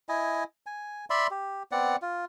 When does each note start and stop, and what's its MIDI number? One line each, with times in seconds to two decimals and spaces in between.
0.09 0.44 64
0.09 0.44 75
0.09 0.44 80
0.66 1.05 80
1.10 1.27 74
1.10 1.27 76
1.10 1.27 83
1.10 1.27 84
1.31 1.63 67
1.72 1.96 59
1.72 1.96 60
1.72 1.96 74
1.72 1.96 78
2.02 2.25 65